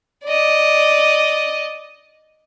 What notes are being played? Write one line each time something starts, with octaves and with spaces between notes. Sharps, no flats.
D5 D#5